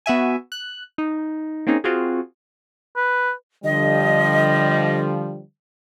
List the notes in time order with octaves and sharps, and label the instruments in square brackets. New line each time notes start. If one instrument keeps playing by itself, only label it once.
[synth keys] B3 F#4 E5 G#5
F#6
D#4
A#3 C4 C#4 D#4 G#4
C4 F4 F#4 G#4
[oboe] B4
[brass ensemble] D3 F3 G3 [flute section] D#5